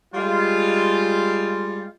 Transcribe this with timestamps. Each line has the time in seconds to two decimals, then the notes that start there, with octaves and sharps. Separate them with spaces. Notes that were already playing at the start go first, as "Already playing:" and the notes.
0.14 G3 G#3 F4